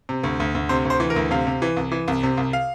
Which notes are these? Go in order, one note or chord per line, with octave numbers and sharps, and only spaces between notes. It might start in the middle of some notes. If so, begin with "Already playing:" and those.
C3
D2
D2
D2
C3 C5
D2
C5
E3
A#4
D2
C3 F5
C3
E3
C2
E3
C2
C3
C2
F5